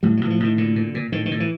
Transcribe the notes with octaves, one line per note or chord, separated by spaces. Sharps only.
A2 G3
F#3
A2 E3
F3
A2 D#3
A#2 D3
A#2
A#2
A2 D#3
D#3
A2
E3